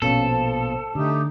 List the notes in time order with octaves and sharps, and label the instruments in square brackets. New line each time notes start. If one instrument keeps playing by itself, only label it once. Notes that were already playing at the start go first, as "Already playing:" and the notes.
[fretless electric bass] A#1 B2 [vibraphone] C#4 C#5 F5 [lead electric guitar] A4
[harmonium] F3 [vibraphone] C5
[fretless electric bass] D3 [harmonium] A3 D#4 G4